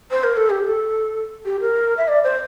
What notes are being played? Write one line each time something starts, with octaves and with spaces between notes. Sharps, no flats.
C5
A#4
A4
G4
A4
G4
A#4
E5
D5
C5